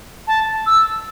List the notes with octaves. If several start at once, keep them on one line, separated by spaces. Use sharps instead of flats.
A5
E6